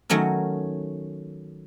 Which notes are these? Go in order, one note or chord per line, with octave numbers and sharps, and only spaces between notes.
D#3 F#3 A3 C#4 A#4